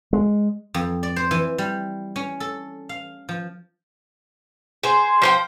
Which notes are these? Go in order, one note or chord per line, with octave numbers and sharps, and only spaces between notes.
G#3
F2
D5
C5
E3
G3
C#4
A4
F5
F3
G#4 C5
F3 C5 G5